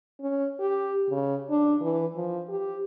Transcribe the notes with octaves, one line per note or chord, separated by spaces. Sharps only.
C#4
G4
C#3
D4
E3
F3
G4